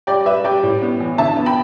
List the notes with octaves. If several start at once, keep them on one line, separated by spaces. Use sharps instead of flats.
G3 D5 G5
G3 B4 E5
G3 D5 G5
A2
B3
E3
D3 E5 A5
B3
G5 B5